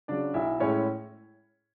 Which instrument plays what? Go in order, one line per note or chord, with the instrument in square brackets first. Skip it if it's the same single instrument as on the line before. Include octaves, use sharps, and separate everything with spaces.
[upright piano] C#3 F#3 D4 D5
B1 E4 E5
A2 G#3 C#4 E4 C#5